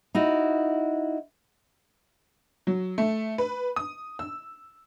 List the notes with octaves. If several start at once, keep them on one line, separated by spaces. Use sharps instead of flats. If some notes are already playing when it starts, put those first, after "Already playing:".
D#4 E4 F#4
F#3
A3
B4
D#6
E6